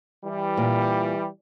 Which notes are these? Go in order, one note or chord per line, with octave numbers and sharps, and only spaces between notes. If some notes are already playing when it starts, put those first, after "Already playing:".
E3 G3
A#2